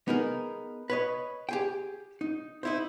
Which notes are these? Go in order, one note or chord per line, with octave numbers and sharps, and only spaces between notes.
B3 D#4 G#4 A#4
B4 C#5 D#5
G4 G#4 G5
D#4
D#4 E4 C5